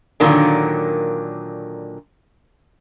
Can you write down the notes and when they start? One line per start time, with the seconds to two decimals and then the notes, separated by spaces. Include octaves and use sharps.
0.20 A#2 D3 D#3 F#3 A#3 D4